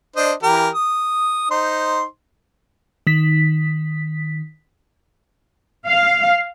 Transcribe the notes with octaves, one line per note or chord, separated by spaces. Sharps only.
D4 C5 D#5
E3 G4 A#4
D#6
D#4 C5 C6
D#3 B6
F5